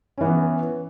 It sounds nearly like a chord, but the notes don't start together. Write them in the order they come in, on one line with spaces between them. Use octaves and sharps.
C#4 E3 B3